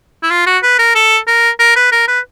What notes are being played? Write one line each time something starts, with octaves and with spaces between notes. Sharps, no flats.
E4
F4
F#4
B4
A#4
A4
A#4
A#4
B4
A#4
B4